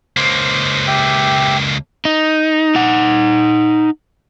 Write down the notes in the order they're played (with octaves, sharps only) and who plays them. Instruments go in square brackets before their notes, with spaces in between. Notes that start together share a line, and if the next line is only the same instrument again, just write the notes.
[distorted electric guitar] C#2 A#3 [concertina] C5
[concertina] G4 E5 G5
[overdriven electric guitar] D#4
D#4 F#5